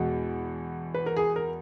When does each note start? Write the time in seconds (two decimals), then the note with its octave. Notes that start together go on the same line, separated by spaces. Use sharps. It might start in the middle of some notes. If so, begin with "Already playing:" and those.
Already playing: E2 B2 G#3
0.94 B4
1.06 A#4
1.17 G#4
1.36 A#4